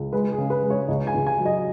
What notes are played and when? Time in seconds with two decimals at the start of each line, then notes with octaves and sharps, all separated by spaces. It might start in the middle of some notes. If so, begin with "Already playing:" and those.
Already playing: C#2
0.13 G#3 B4
0.32 G#4
0.38 C#3
0.50 B4
0.63 G#3
0.70 C#5
0.88 C#2 D#5
1.07 G#5
1.14 C#2
1.27 G#5
1.39 F#3
1.45 D#5